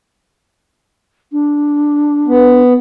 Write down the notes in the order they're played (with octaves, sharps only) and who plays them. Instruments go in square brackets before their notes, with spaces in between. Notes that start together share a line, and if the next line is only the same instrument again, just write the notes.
[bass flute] D4
[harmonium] B3